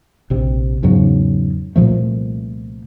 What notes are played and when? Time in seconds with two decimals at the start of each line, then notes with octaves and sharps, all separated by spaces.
0.30 A#1 C3
0.82 E2 G#2 C#3 F#3
1.76 C2 A#2 F3 A3